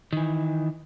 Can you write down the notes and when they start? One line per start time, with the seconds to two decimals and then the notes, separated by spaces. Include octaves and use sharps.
0.13 D#3 E3